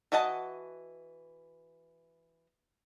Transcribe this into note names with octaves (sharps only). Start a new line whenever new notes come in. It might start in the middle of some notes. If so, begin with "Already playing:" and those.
E3 F#4 D#5 F#5 A5